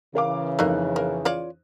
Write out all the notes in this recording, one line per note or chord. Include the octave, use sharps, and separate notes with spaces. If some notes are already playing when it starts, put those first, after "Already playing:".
C#3 E3 A#4 F5 D6
F2 A3 A#3 D#4 F#6
A#3
F4 C#5 D5